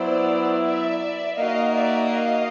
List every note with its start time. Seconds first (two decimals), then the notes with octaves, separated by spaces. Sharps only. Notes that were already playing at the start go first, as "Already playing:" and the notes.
Already playing: F#3 B3 E4 C5 D5
0.64 D5 E5
1.38 A#3 D#4 F#4 D#5 F5
1.75 D5 E5
2.13 D#5 F5